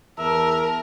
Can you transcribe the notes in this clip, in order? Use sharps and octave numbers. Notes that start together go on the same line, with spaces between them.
E2 A#4 E5 A5